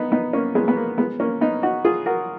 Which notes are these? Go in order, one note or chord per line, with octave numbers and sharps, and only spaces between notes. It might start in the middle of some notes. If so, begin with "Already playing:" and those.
Already playing: B3 D#4
B3 D#4
A#3 C#4
G#3 B3
B3
A#3
G#3 B3
A#3 C#4
B3 D#4
D#4 F#4
F4 G#4
F#4 A#4